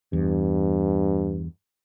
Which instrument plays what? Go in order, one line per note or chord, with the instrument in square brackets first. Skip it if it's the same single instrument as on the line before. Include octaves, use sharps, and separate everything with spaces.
[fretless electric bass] E2 [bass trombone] G2